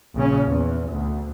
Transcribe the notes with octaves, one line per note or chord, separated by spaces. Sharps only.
A#1 C#3 C#4
E2
D2